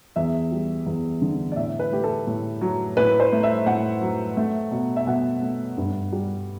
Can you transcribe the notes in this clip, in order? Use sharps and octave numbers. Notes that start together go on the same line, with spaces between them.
E2 E5
G3
E2
D3
D5
A2 E5
B4
A3 G4
A4
A2
F#3
A2 B4
C5
A3
E5
A2 F#5
F#3
A3
B2
E5
B2 F#5
A3
G2
G3